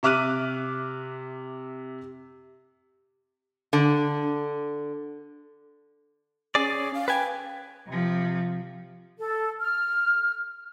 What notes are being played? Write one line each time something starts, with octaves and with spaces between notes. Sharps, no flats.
C3 E5 D6 F6 F#6 D#7
D3
C#4 G#4 D5
F5
B4 G5 G#5
C3 F3
A4
F6